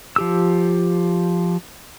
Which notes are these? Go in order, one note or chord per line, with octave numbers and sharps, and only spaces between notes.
F3 G4 E6